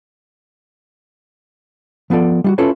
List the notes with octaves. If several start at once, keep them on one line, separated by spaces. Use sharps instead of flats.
F3 B3 F4 A4 D5
G3 F4 F#4
C#4 E4 F4 A4 B4 C#5